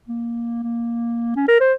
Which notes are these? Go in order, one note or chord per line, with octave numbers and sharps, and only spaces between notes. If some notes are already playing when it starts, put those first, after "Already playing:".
A#3
A#3
C#4
A#4
C5